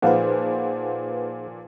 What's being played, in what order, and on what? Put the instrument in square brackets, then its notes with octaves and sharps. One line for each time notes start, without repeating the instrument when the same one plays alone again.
[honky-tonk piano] A#2 F3 [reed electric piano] D#4 G#4 C5 [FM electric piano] B4 F5 F#5